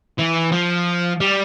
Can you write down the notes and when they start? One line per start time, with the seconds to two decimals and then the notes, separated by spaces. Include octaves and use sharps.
0.19 E3
0.52 F3
1.20 G3